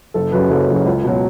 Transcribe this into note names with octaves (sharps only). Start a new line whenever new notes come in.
F#1 A4
F#2 C#3 F#3 B4
F#1 A4
F#2 C#3 F#3
C#2
B2 F#3